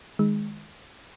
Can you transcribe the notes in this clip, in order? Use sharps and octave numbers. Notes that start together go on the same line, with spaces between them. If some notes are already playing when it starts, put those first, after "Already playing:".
D#3 G#3